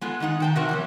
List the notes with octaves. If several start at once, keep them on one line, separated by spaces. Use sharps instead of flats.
G#3 B3 F4 A4
D#3 G#3 D#4 F#5
D#3 G5 A5
C3 F#4 A#4 F#5
E3 F#3 B3